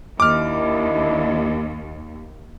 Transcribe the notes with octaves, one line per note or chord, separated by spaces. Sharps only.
D#2 D4 E4 D#5 D6 F6